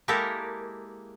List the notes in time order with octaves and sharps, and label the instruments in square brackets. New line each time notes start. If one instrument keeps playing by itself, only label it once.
[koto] G#3 A#3 E4 G4 A4 A#4